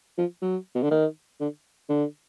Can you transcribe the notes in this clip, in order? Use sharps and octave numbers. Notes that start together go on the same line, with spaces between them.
F3
F#3
B2
D3
D#3
D3
D3